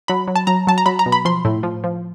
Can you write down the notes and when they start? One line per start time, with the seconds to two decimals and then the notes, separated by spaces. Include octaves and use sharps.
0.08 F#3 B5
0.28 F#3
0.36 A5
0.47 F#3 A#5
0.67 F#3 A5
0.78 A#5
0.86 F#3 B5
0.99 A#5
1.06 B2
1.12 B5
1.25 F3 C6
1.45 A2
1.63 F3
1.84 F3